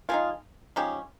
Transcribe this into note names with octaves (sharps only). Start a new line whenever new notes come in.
F3 G#3 D#4 F4 G#4
F3 G#3 C#4 D#4 G4